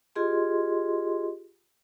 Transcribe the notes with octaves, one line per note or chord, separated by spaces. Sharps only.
F4 G4 G#4 D#5 C6